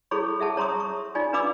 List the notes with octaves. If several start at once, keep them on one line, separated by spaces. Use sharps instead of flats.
E4 G#4 A4 C#5 B5 C#6
G#4 E5 F#5 A5
C#5 A#5 C6 C#6 D#6
C#6
D#4 F4 D5 G#5
D4 B4 F5 B5 D6 E6